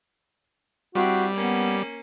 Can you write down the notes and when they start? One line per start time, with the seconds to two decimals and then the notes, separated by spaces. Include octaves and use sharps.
0.95 G3 C4 E4 F#4
1.35 A#3 B3 C#4